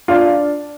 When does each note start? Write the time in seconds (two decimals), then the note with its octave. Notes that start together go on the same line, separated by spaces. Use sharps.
0.08 D4 F4